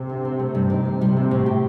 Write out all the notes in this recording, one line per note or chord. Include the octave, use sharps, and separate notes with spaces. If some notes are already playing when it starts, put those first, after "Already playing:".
Already playing: C3
D3
C4
A3
G2
D#3
D#3
C3 G3
A#3
A2
G4